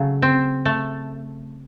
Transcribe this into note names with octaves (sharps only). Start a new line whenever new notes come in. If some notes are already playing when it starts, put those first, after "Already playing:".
Already playing: C#3 F#3 A3
C4
A3